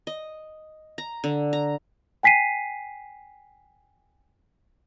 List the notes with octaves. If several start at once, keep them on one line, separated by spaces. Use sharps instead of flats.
D#5
A#5
D3
A#5
G5 G#5 B6 C7 D#7